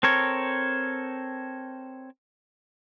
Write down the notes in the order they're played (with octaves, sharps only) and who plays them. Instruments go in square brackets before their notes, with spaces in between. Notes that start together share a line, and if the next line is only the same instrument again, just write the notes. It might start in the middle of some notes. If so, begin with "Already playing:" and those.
[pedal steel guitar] C4 A4 A#4 C#5